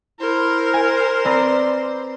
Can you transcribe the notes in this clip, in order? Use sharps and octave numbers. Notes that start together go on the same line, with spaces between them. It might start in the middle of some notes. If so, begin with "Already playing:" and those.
E4 A#4 C5
G#5
C4 B4 D5 A#5